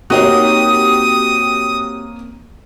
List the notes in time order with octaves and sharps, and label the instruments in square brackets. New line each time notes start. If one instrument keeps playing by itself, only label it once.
[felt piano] A#3 C#5 [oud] C4 D#4 A#4 [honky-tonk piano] F#4 G4 [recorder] D#6